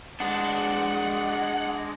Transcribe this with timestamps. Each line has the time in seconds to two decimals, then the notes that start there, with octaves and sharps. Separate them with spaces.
0.20 G#3 D4 F#5